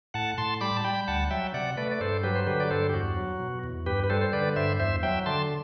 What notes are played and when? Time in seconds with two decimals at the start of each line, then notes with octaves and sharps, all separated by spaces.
0.14 A2 F#5 A5
0.38 A2 A5 C6
0.61 G3 B5 D6
0.77 A5
0.84 G3 G5 B5
1.08 D2 F#5 A5
1.31 F#3 E5 G5
1.54 C3 D5 F#5
1.77 A3 B4 D5
1.92 D5
2.00 G2 A4 C5
2.23 F#3 G4 B4
2.35 C5
2.47 D3 G4 B4
2.60 D5
2.70 G2 A4 C5
2.89 G4
2.94 E2 F#4
3.17 F#3
3.40 B2
3.64 E2
3.86 G2 G4 B4
4.04 B4
4.10 G3 A4 C5
4.21 C5
4.33 D3 B4 D5
4.56 G2 C5 E5
4.79 E2 C5 E5
5.03 F#3 E5 G5
5.26 D3 A5 C6